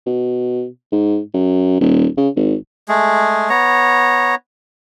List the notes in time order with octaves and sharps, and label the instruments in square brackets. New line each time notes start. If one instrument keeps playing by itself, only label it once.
[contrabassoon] B2
G#2
F#2
D#1
C#3
G#1
[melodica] G#3 A3 G#4
B3 C#5 A#5